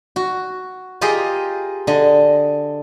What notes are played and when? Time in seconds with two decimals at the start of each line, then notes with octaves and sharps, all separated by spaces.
0.16 F#4
1.01 F4 G4 G#4 A#4 D#5
1.87 D3 D#5